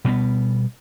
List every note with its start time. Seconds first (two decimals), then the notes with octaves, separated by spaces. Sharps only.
0.05 B2 G3 B3